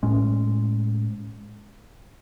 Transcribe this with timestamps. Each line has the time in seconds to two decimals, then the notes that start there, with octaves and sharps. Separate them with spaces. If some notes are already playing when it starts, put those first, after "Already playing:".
0.03 A2 G#3 C#4